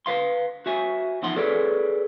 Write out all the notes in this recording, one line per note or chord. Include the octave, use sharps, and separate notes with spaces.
B4 F5 C6
F#4 E5 G#5
E2 F3 D#4 F#5 C6
G#4 A4 B4 C#5 D5